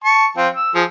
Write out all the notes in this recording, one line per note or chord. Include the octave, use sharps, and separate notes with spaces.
A5 C#6
F3 C4 F4
E6
F3 G#4